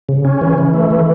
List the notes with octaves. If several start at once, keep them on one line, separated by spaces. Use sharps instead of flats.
C#3
C#4
E3
E3
A3
E3